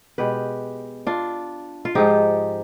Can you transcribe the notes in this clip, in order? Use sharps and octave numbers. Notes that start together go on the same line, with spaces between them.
B2 G#3 G4 B4
D4 F4
F4
G#2 F3 G#3 D#4 G4